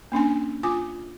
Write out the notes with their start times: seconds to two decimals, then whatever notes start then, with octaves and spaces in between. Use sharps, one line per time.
0.12 A#3 C#4 D4 G#5
0.63 F4 G#5 D6